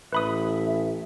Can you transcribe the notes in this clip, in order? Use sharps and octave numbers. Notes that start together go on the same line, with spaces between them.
A1 B4 E5 B5 D#6